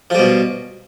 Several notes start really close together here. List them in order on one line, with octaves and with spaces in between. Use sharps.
F3 G3 B2